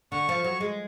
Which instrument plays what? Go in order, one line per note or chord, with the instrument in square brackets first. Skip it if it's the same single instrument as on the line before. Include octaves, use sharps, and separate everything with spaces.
[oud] D3 [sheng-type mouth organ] C#6
[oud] F3
F#3
G#3